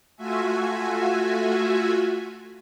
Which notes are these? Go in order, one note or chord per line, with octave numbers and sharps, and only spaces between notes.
A3 F4 F#4 E5 G#5